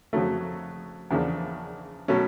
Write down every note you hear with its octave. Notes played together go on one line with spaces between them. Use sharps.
F2 C#3 F#3 A3
E2 C#3 F3 A#3 D4
B2 F#3 A3 C#4